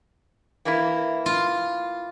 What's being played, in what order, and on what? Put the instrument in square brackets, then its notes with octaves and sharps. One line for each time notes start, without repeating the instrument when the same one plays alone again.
[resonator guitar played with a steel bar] E3 A#3 E4
[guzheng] F4